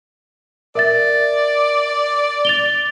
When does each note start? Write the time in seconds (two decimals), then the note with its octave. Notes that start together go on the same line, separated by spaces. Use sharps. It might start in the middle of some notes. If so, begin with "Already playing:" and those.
0.75 A#4 D5 E5 A6
2.45 A6 F7 G7